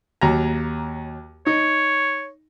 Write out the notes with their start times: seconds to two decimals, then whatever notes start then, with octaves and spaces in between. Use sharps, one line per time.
0.21 D#2 F#3 A#5
1.47 D#4 C#5